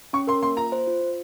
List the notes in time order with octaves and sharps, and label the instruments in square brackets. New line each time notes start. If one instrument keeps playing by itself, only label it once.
[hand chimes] C#4 [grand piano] C#6
[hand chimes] A#4 [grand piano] C6
[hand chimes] A#3 [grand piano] C6
[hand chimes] F4 [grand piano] A#5
[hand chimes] C5
F4
F4